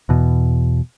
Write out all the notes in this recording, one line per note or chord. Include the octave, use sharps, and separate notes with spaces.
E2 B2